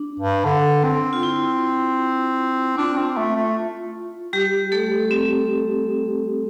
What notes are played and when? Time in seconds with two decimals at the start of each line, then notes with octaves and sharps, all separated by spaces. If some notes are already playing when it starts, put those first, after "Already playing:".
Already playing: D4
0.20 G2
0.45 D3
0.84 C4
1.13 F4
1.23 E4
2.78 D4 F4
2.97 C4
3.17 A3
3.36 A3
4.33 G3 G4
4.72 A3 A4
5.11 C4